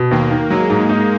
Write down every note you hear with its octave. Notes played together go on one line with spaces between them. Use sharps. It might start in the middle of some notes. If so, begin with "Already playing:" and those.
Already playing: B2
D#2 A#3
D#3
F#3 G#3
G#2
D#4